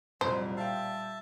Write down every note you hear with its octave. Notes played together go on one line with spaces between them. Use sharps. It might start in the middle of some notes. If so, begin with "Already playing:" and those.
C2 F2 A#2 F#3 G3 C5
E5 F5 G5 A5